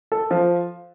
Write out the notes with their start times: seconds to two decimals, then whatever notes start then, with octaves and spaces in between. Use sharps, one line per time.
0.12 A4
0.31 F3